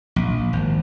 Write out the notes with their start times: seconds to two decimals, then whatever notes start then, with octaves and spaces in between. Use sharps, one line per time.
0.16 A#1
0.53 G#1